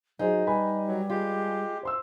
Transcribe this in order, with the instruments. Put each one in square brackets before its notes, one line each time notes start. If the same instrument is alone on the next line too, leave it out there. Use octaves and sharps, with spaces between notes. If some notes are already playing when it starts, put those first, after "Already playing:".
[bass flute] F#3 [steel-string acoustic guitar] D#4 [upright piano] F4 G#4 C5
[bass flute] G3 [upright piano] B4 G#5 B5
[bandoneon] F#3
[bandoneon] G#3 G4 [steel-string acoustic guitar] F4
[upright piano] C5 C6 E6